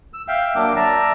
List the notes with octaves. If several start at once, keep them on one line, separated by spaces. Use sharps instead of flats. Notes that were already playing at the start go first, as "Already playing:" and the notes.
E6
E5 F5 G5
F#3 A#3 D4 D6
D5 E5 A5 A#5